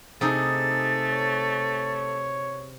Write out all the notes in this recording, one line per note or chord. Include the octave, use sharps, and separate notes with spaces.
C3 A3 D#4 G#4 A6
C#5